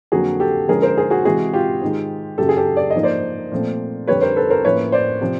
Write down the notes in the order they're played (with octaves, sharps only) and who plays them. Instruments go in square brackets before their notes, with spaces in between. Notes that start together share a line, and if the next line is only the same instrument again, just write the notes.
[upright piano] F2 D3 F#3 A#3 F#4 G#4
G4 A4
D3 F3 G#3 C#4 G#4 A#4
A#4 C5
G#4 A#4
F#4 G#4
C3 E3 G#3 F#4 G#4
F4 G4
G#2 D#3 G#3
F#2 C#3 F#3 G4 A4
G#4
G4 A4
D5
D#5
G#2 F3 A#3
C5 D5
A#2 F3 A3 C4
F2 D3 G3 B4 C#5
A#4 C5
A4 B4
A#4 C5
A2 F3 A#3 C#4 B4 C#5
C5 D5
C3 F3